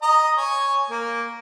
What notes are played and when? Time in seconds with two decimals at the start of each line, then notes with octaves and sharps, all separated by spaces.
0.02 D#5 A#5 D#6
0.37 C#5 G#5
0.90 A#3